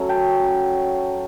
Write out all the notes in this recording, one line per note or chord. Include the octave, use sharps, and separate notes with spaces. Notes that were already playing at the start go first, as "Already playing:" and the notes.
Already playing: F#3 A3 C#4
G5 A5